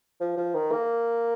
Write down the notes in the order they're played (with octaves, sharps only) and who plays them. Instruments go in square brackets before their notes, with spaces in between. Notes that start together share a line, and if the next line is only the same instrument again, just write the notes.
[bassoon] F3
F3
D#3
A#3